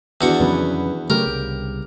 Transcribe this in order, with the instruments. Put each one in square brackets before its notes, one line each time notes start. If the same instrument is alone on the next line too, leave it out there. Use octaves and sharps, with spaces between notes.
[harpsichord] E2 F#4 C#6 [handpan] D#3 D4 D5
[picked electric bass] F2 C#3 F#3 [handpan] B3 B4
[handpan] C#3 G4 [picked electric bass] F#3 G#3 A3 [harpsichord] A#4
[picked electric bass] C2